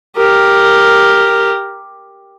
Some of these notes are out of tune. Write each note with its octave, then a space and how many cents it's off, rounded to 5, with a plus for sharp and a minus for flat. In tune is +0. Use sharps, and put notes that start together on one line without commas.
G4 +5 A#4 +0